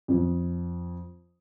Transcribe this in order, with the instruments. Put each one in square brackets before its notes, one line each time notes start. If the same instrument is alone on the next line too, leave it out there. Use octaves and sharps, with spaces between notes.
[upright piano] F2